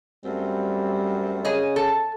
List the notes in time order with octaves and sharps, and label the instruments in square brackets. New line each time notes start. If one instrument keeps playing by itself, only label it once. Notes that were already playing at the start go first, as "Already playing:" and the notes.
[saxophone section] F#2 A3 C4 [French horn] G3
[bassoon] C#3 [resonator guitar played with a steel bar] G#4 D#5
[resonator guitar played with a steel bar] A4